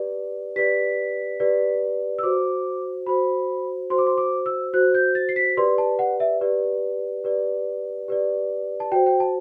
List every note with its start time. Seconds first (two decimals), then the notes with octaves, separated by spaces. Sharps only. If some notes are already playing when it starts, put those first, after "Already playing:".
Already playing: G4 B4 D5
0.56 G4 B4 D5 B6
1.40 G4 B4 D5
2.19 E6
2.23 F#4 C5 D6
3.06 F#4 C5 B5
3.90 F#4 C5 C6
3.98 D6
4.07 C6
4.17 D6
4.46 E6
4.74 F#4 C5 F#6
4.94 G6
5.15 A6
5.29 C7
5.36 B6
5.57 G4 B4 D5 C6
5.78 A5
5.99 F#5
6.20 E5
6.41 G4 B4 D5
7.24 G4 B4 D5
8.08 G4 B4 D5
8.80 A5
8.92 F#4 C5 G5
9.06 G5
9.20 A5